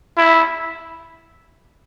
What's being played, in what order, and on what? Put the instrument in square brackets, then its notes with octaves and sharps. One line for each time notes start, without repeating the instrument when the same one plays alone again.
[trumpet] E4